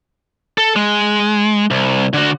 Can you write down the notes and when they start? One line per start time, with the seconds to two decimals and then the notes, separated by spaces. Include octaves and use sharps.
0.58 A4
0.76 G#3
1.71 C2
2.14 D3 F#4